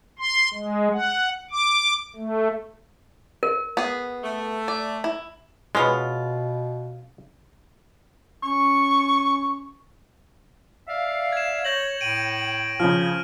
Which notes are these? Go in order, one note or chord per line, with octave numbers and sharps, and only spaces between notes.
C6
G#3
F#5
D6
A3
A#4
B3 G#4
A3
D5
E4
B2 G#3 B3 C#4 F4
C#4 C#6
D5 E5 F5
G#6 E7
C#5 G6 A#6 F#7
A2 C#5 G5 D7 D#7 F#7
C#3 F3 F6